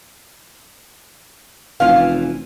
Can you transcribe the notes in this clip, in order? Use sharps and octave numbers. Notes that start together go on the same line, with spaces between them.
F1 E3 C#4 F4 F5